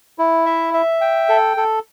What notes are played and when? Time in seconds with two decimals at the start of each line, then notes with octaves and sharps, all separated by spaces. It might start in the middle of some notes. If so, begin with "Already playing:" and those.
0.18 E4
0.46 E5
0.74 E5
1.01 G5
1.29 A4
1.57 A4